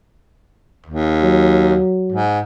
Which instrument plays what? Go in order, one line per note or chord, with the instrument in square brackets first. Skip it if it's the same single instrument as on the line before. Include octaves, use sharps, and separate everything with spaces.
[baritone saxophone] D#2
[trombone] F#3
[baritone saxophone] G#2